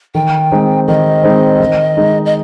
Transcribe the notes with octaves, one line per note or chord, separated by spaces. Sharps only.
D#3 G5
G#3 C4 D#4
D#3 D#5
G#3 C4 D#4
D#3
G#3 D#4
D#5